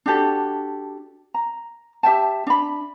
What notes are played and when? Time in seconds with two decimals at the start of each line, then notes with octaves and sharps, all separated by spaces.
0.06 D4 F#4 G4 A4
1.34 A#5
2.03 G4 E5 G5 A5
2.47 D4 B5